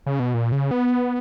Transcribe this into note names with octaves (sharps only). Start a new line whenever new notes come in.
C#3
B2
A#2
C#3
B3